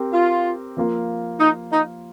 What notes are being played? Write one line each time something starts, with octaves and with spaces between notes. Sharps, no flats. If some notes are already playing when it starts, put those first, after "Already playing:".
Already playing: C4 G4 A#4
F4
F3 A#3 F4
D#4
D#4